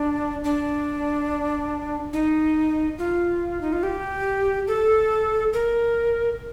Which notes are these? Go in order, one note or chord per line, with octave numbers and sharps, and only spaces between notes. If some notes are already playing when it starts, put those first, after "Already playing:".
Already playing: D4
D4
D#4
F4
D#4
F4
G4
A4
A#4